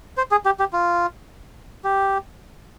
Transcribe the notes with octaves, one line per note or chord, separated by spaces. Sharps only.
C5
G#4
G4
G4
F4
G4